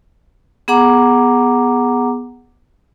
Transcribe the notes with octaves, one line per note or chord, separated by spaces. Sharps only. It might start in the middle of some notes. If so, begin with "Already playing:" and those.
B3 G#4 F#5 A#5 D6